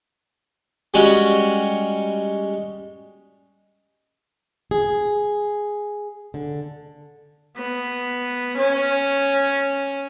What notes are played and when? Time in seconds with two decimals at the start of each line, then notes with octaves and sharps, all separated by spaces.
0.94 G3 G#3 C#4 F#4
4.71 G#4
6.34 D3
7.57 B3
8.57 C#4